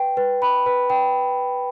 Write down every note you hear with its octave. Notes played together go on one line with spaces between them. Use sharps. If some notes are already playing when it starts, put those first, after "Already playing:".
Already playing: B4 G5
B4
B5
B4
G5